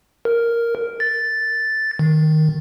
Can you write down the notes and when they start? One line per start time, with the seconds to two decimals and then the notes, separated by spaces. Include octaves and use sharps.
0.25 A#4
1.00 A6
1.99 D#3